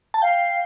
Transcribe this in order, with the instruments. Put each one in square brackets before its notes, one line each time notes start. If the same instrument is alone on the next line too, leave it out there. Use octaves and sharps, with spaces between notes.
[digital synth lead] A5
[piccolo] F5 [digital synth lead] G5